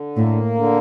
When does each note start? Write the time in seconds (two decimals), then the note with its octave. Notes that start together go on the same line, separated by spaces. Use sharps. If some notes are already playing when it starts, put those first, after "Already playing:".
Already playing: D3
0.16 A2 A#3
0.55 D3